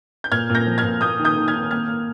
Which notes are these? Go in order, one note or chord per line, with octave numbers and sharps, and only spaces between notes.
G6
A#2 F6 G#6
A#2
G6 A#6
F3
F6 G#6
A#2
A#3 D#6 G6
D#3
D#6 G6
D#3
F6 G#6
D#3
A#3 F6 G#6
A#3